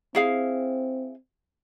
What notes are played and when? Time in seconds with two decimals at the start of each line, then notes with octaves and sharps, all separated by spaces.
0.15 C4 E4 G#4 F5